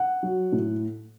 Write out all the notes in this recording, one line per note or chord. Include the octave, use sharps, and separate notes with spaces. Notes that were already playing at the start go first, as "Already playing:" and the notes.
Already playing: F#5
F#3
A2